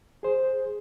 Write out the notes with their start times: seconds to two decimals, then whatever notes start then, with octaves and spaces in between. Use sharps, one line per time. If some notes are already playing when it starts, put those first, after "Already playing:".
0.23 G#4 C5